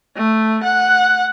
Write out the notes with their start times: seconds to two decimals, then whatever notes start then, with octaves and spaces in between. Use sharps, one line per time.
0.17 A3
0.64 F#5